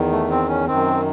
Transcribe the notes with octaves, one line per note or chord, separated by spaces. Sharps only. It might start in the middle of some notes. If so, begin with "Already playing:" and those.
Already playing: E2 D#3
A3
C4
C#4
F#2 D#3 C4